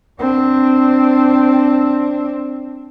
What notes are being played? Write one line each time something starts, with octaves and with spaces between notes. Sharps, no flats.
C4 D4